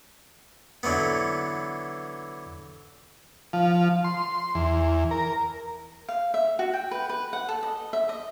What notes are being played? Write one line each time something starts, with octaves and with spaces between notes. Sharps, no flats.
D3 E3 F#3 B3
F3
C6
E2
A#4
F5
E5
F#4
G5
B4
B4
F#5
A4
D#5
E5
D#5